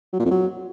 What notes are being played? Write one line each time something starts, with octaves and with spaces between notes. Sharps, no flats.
F#3
A#2
F2
F#3